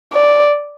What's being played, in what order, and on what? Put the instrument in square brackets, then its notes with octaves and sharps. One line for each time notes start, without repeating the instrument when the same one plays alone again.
[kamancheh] D5